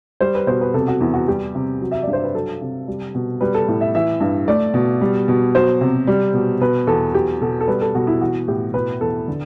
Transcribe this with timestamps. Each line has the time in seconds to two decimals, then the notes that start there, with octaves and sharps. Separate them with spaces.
0.21 G3 C5
0.35 B4
0.47 B2 C5
0.61 B4
0.74 C3 A4
0.88 F#4
1.00 E2 E4
1.14 F#4
1.28 G3 G4
1.55 C3
1.81 F#3
1.91 E5
2.02 D5
2.07 G2
2.13 C5
2.24 B4
2.34 F#3 A4
2.61 C3
2.88 G3
3.15 B2
3.41 G3 B4
3.54 A4
3.68 A2
3.81 E5
3.95 E3 E5
4.20 G2
4.48 A3 D5
4.74 B2
5.01 G3
5.28 B2
5.55 F#3 C5
5.81 C3
6.07 G3
6.34 B2
6.60 B2 B4
6.87 E2 A4
7.14 F#3 G4
7.41 B2 A4
7.61 A4
7.68 G3 B4
7.81 A4
7.95 B2 F#4
8.07 E4
8.20 E3 F#4
8.48 A2 G4
8.74 B2 B4
9.00 E2 A4
9.28 D3